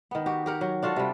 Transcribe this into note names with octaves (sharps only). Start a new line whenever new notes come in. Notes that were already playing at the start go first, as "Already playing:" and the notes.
D#3 B3
F#4 G4
G4 A#4 F#5
F#3
D4 F4 F#4 A4
C3 G3